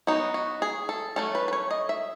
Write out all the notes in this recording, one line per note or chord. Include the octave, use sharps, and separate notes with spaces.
F#3 B3 D#4 F#4
F#4
G#4
A4
F#3 A3 C#4 A4
B4
B4
C#5
D#5
E5